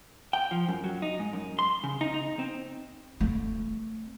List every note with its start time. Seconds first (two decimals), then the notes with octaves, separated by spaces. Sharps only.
0.33 G5
0.51 F3
0.68 F#2
0.84 F#3
1.02 D#4
1.19 G#2
1.33 F#2
1.59 C6
1.84 C#3
2.01 D#4
2.14 D#4
2.39 C4
3.20 A3 C4